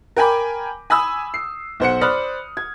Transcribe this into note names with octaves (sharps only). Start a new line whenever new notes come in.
A#4 G5 G#5 B5 D6
G#5 B5 D#6 E6
C7
B1 C5 F#5 C#7
C5 D5 B5 D#6 F6 F#6
G#6